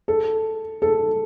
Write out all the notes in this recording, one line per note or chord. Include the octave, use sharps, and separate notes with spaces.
A4
A4